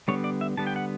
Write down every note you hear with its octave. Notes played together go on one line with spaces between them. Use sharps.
D3 G3 B3 C#5
D5
E5
D3 G3 B3 A5
G5
F#5